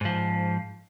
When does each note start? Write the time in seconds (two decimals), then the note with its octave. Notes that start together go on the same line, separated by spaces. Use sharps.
0.01 G#2 F3